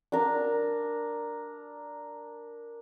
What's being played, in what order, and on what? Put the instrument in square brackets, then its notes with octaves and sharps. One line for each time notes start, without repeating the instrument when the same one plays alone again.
[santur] D4 A#4